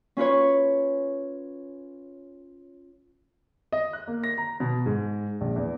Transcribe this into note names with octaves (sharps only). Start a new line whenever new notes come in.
C#4 F4 B4 C#5
D#5
F#6
A#3
A#6
A#5
B2
G#2
A#1
E2